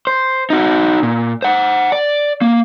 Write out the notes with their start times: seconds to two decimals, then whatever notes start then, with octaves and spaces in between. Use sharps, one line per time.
0.07 C5
0.50 D#4 F#4
1.03 A#2
1.42 C5 F#5
1.92 D5
2.41 A#3